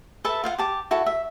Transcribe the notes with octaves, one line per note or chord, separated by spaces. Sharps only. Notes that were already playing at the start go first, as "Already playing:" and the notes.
A4 B4 E5 A5
F4 F5 F#5
G4 A5 D6
E4 F#4 A4
E5